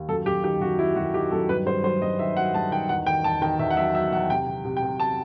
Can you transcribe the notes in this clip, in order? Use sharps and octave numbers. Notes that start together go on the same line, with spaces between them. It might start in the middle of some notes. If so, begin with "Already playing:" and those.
Already playing: D#2
F#2 A4
F#2 G4
D#3 G4
F#2 F#4
F#3 E4
F#2 F#4
D#3 G4
F#2 A4
G2 B4
G2 C5
F#3 C5
G2 D#5
D#3 E5
F#3 F#5
G2 A5
D#3 G5
E2 F#5
D#3 G5
E2 A5
D#3 G5
E2 E5
F#5
F#3 E5
F#3 E5
E2 F#5
C3 G5
C3
C3
G5
C3
A5